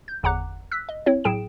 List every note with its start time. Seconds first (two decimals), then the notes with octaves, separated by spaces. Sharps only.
0.08 G6
0.23 G1 E2 F#5 A#5 D6 F#6
0.71 E6 F#6 B6
0.89 D#5
1.06 C4 E4 C#5
1.24 A2 F#3 G#4 G5 D7 E7